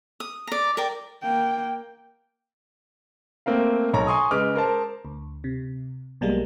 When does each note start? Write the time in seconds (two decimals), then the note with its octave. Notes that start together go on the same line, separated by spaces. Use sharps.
0.20 D#6
0.47 D5 A#5
0.77 A#4 D5 G5
1.23 A#3 G5
3.46 A3 A#3 C4 A#4 F5
3.93 B1 C#5 A#5
4.07 G#5 C6 C#6 D#6
4.31 C#3 G#3 B4 D6 F6
4.56 A#4 C5 A5
5.05 D2
5.44 C3
6.21 B1 B2 G3 G#3 A#3